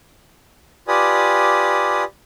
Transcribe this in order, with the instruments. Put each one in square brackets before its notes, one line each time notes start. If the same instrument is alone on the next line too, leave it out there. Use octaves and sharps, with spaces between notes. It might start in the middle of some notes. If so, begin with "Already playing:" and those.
[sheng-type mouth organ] F4 G4 B4 D5 G#5 D#6